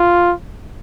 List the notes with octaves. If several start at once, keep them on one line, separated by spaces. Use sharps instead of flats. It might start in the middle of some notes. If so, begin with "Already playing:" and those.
Already playing: F4